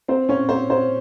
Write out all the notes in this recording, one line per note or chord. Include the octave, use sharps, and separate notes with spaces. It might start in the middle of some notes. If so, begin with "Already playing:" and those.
C4 C5
C#4 C#5
C4 C5
C4 C5